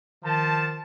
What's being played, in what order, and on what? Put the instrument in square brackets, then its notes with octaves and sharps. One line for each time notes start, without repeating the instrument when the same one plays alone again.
[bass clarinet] D#3 [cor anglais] F3 [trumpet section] A5